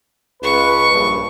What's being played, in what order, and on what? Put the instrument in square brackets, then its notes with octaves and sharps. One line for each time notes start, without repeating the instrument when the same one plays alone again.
[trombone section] C#2 B4 [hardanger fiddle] C#6
[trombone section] A#1 G2